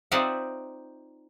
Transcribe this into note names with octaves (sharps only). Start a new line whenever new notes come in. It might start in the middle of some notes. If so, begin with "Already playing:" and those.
C4 D#4 F4 D5 E5 F#5